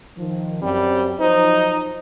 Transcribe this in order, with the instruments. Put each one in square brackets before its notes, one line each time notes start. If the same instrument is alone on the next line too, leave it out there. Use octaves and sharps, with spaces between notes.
[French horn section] D#3 F3
[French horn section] F#2 C4 [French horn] G3
[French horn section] F3 F#3 C5 [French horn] D#4